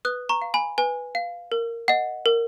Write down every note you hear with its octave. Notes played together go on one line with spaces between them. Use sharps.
B4 D#6 F#6
A#5 C#6
F5
G#5 B5
B4 G#5
F5
A#4
D#5 F#5
A#4